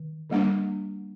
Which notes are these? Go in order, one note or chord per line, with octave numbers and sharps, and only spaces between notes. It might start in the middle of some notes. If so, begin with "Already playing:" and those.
Already playing: D#3
D3 G3 A#3 D4